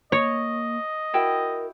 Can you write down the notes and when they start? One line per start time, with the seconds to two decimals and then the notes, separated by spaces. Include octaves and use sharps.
0.12 A#3 C#5 D#5
1.14 E4 F#4 A#4 G5